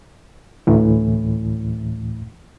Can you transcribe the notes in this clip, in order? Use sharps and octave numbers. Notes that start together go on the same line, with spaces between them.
D2 A2 E3